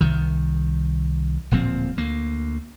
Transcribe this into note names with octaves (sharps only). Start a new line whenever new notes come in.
C2 D#3
D1 A#2 F3 C4
D2 A#3